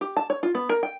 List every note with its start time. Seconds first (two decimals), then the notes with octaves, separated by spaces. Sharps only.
0.01 G4
0.17 A5
0.30 C#5
0.43 F4
0.55 B3
0.69 A#4
0.83 G5